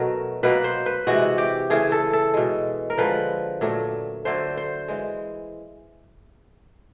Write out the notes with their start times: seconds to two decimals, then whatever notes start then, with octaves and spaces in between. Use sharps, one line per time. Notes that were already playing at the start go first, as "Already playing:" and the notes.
Already playing: B2 F#3 A3 A#4
0.43 B2 F#3 A#3 B4
0.64 C5
0.86 B4
1.07 C3 E3 G#3 F#4
1.38 G4
1.70 C#3 E3 A3 G#4
1.92 A4
2.13 A4
2.34 B2 G#3
2.90 A#4
2.98 D3 F3 G#3 B4
3.61 A#2 F#3 A3
4.25 D3 F#3 A3 C5
4.57 C5
4.88 E3 G#3